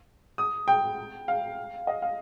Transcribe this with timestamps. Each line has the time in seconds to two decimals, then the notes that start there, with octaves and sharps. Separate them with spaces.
0.38 D#6
0.68 G5
1.28 F5
1.87 D#5
2.02 F5